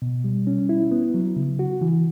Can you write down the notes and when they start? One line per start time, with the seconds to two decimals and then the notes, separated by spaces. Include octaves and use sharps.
0.02 B2
0.24 G3
0.47 C#4
0.69 E4
0.91 B3
1.14 F#3
1.37 C#3
1.59 F#4
1.81 E3